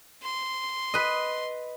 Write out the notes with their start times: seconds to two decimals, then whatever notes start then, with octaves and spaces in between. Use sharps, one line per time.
0.23 C6
0.94 B4 D#5